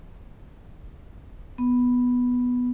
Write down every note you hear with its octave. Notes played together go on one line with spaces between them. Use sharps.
B3